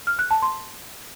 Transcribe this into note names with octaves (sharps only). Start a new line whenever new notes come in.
F6
F#6
A5
C6